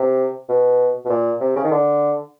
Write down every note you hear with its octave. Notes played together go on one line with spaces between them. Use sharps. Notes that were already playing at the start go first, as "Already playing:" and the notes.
Already playing: C3
B2
B2
A#2
C3
C#3
D#3
D3